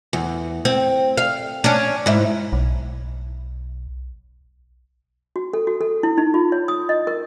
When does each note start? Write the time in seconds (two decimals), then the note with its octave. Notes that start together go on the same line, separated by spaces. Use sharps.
0.13 E2
0.65 C4
1.18 F5
1.64 C#4 D4
2.06 G#2 E4
2.53 B1
5.36 F#4
5.53 A4
5.67 F#4
5.81 A4
6.03 E4
6.18 D#4
6.34 F4
6.52 C#5
6.68 D#6
6.89 D#5
7.07 A#4